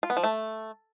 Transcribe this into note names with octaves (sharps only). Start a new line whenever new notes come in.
F4
B3
F3
A3